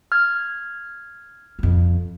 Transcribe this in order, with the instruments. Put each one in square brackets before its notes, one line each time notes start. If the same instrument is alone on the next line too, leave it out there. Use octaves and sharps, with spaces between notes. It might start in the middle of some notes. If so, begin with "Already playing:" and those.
[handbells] F6 G#6
[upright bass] F2 F3